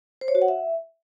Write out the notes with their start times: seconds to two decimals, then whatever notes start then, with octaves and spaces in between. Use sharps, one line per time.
0.21 C5
0.28 C#5
0.35 F#4
0.42 F#5
0.48 E5